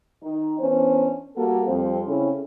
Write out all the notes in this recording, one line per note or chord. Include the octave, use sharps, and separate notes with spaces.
D#3 D#4
E3 B3 C#4 D4 C5
G3 A#3 F#4 A4
F2 G3 C4 C5
C#3 C4 C#4 E4 A4